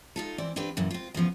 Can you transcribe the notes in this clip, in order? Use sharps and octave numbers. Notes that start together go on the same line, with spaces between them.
D#4 F4 A4
E3 C4 D5
C4 D4 F4 G4 B4
F#2 A#2 E3
C4 F4
E2 C#3 F3 B3